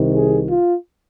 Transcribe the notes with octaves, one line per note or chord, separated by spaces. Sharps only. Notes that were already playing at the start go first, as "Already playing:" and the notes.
Already playing: C2 C3 D#3
G#4
F4